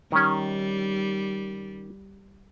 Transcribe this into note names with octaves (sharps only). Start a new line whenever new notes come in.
D#3 G3 C#4